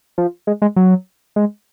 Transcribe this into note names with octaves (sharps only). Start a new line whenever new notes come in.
F3
G#3
G#3
F#3
G#3